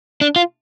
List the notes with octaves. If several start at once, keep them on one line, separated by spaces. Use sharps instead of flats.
D4
F4